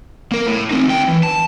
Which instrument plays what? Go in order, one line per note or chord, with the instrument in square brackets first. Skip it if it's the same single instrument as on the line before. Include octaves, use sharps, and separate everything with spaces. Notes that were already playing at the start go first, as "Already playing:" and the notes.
[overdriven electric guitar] A#3 A#4
A2
C4 D#4
D2 G5
E3
A5